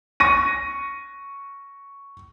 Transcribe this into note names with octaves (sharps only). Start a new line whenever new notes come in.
C#6 A#6 D#7